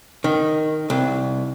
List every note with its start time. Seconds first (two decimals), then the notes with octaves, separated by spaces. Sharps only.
0.24 D#3
0.90 C2